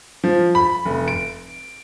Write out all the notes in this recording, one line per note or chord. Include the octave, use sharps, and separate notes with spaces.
F3
B5
F1
D7